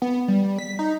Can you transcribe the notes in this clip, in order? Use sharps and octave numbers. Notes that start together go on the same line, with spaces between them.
B3
G3
B6
D#4